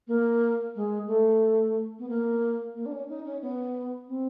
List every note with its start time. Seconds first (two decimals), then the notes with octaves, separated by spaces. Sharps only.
0.07 A#3
0.75 G#3
1.07 A3
1.99 B3
2.09 A#3
2.74 A#3
2.86 D4
2.92 C#4
3.09 D#4
3.25 C#4
3.42 B3
4.08 C4